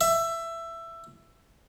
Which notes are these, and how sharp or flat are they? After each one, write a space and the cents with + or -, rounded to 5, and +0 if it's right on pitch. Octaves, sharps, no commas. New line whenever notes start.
E5 +15